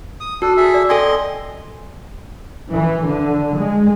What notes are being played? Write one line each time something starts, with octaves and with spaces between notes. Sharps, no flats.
D#6
D4 F#4 A4
G#4 A4 E5
D5
C4 A4 D#5 G#5 C6 G#6
E3
D3
G#3